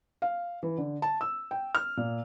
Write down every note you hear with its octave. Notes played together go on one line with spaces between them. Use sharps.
F5
E3
D3
A5
E6
G5
F6
A#2